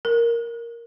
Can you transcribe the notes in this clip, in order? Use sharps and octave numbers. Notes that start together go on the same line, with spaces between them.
A#4